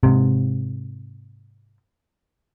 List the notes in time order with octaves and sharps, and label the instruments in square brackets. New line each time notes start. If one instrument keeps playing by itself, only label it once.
[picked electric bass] G#2 C3